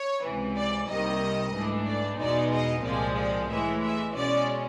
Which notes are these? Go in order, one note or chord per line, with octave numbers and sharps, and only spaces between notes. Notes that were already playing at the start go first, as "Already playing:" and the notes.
Already playing: C#5
C#2 C3 E3
D5
C2 C3 D#3 G3 A#3 D#5
G#2 E3 A3 D4
D5
E2 B2 G#3 B3 D#4 D5
D#5
C2 A#2 F3 G#3 C4 D5
D5
A2 E3 G#3 E5
E5
B2 G#3 C#4 D5